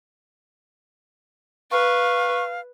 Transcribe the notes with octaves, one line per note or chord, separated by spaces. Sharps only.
B4 F5 C#6